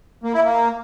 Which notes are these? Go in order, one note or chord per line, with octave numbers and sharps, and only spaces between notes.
A#3
E4
A#3